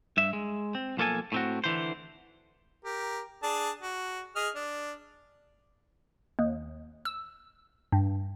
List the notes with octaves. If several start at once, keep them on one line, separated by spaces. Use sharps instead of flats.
G2 E5
G#3
C4
B1 F3 A#3 A4 G#5
A2 C4 F#4
D3 E3 C5
G4 A#4
D4 G#4 A5
F#4
G#4 D#5 F6
D4
D#2
E6
G2